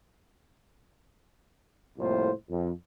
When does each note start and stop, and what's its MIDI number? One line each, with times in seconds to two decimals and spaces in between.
1.98 2.31 36
1.98 2.31 41
1.98 2.31 45
1.98 2.31 58
1.98 2.31 65
1.98 2.31 72
2.50 2.71 41